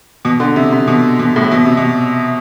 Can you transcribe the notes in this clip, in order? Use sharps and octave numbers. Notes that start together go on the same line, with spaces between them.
B2
D3
C3
C3
B2
B2
A2
B2
C3
B2